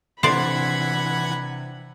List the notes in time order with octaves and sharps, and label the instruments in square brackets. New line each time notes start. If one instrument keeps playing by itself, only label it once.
[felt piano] C3 D4 [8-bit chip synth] E3 F#5 G#6 [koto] C5 D5 [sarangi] B5